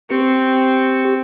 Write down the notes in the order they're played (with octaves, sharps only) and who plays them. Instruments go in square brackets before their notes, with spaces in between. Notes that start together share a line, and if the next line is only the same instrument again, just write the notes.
[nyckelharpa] C4 [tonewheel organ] G4 C#6